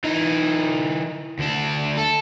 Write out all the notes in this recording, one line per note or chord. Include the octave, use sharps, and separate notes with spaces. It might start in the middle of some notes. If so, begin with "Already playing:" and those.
E3 D#4
D2 D4
A4